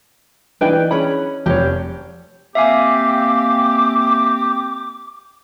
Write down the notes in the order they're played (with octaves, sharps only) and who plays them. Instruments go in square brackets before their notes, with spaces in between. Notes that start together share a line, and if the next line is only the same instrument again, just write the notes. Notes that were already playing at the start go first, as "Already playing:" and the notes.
[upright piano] E3 D4 D#4 [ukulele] B4 G5 G#5
[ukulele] C#4 G#4 B5
[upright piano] F1 [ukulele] G4 C#5
[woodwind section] A#3 C4 [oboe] G4 [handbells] E5 F5 G#5 [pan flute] D6